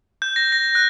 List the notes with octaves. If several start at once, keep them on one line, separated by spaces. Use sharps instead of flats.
G6
A#6
A#6
F#6